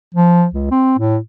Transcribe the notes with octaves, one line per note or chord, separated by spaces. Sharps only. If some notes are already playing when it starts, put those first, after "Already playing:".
F3
C#2
C4
A2